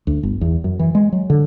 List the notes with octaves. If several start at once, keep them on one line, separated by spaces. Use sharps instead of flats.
D2
G1
E2
F#2
E3
G#3
F#3
D3